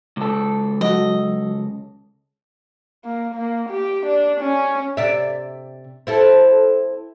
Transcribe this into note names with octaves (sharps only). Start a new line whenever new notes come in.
C#2 A4
F#3 F#4 D#5
A#3
A#3
G4
D4
C#4
C3 D5 E5
C4 E4 A4